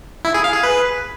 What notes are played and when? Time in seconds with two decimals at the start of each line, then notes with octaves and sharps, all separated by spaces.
0.25 E4
0.34 G#4
0.44 F5
0.54 G#4
0.63 B4